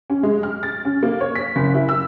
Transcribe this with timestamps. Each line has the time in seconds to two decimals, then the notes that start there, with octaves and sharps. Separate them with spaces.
0.10 C#4
0.23 G#3
0.43 F6
0.63 A6
0.85 C#4
1.03 A#3
1.21 C#5
1.35 B6
1.56 F#1
1.74 E4
1.89 E6